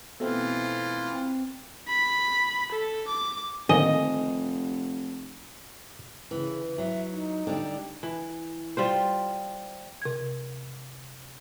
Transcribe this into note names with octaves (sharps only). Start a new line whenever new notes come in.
B2 E3 A3 C4 F4 A4
C4
B5
A4
D6
F1 D3 D#3 A#3 D#5 G#5
C#3 E3
F#3 E5
D#4
D3 G3
E3
G3 F4 C5
C3 G#6